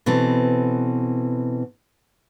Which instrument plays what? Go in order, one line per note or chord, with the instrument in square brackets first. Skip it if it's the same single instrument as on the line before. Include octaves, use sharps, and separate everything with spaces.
[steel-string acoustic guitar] B2 E3 C4 A4